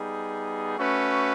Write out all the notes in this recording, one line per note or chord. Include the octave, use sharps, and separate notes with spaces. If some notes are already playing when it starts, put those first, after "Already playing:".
Already playing: G3 B3 D#4 G#4
A3 C#4 F#4 B4